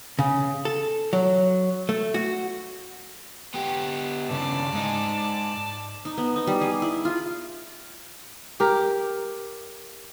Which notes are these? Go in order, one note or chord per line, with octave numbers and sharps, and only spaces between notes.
C#3
A4
F#3
A3
F#4
B3 G4
G2 C#3 D5 A5
G#2 D#4
D#4
B3
D#4
G3
G#4
E4
F4
G4 A#4